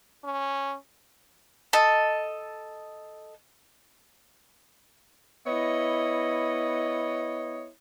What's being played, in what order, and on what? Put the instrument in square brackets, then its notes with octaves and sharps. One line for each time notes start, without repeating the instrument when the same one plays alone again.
[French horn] C#4
[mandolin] A4 D#5
[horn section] B3 E4 C#5 D#5